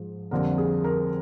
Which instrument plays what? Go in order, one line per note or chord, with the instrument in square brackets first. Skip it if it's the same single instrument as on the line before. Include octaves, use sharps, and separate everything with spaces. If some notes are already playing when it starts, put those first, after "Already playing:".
Already playing: [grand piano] G#2 F3
F2 D3 G3 A#3 A#4
G#4
A#4